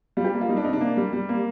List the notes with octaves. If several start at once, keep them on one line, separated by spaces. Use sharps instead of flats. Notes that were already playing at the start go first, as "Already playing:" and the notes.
G3 F4
G4
A#3
F4
G3 D#4
D4
C3 D#4
D4
A#3
G3
G3
A#3